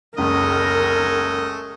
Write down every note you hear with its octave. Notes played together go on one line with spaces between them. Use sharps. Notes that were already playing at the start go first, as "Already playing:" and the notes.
F#1 C#2 G#3 A3 A#4 D#5